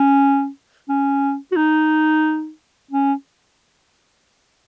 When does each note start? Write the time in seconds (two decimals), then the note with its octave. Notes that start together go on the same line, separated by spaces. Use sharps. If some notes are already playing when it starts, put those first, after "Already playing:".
Already playing: C#4
0.89 C#4
1.52 F#4
1.56 D#4
2.91 C#4